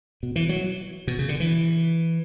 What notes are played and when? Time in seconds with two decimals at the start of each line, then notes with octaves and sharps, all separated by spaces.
0.23 B2
0.36 E3
0.49 F#3
1.07 B2
1.19 C#3
1.29 D3
1.40 E3